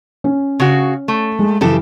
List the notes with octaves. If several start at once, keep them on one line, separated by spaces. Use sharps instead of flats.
C#4
C#3 F#4
A3
G#3
F#2 C#3 E3 G4 A4